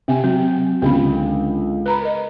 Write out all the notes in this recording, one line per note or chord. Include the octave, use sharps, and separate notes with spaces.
C3 C4 G#5
F#3 C4
C#2 D3 B3 B5
B4 A#5 B5
A#4 D#5